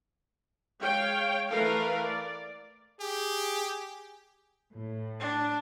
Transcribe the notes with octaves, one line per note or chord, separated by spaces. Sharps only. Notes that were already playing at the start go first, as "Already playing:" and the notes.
G#3 C#5 F5 G5
E3 A3 A#4 B4 F5
D5
G4 G#4
A2
D4